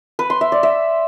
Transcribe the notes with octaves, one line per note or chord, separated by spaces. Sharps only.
B4
C6
E5
D5
E5